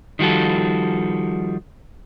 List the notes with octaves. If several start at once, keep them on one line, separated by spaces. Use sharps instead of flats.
D#3 F3 G3 F#4 A4